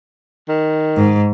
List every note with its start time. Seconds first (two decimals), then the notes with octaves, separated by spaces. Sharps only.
0.48 D#3
0.97 G#2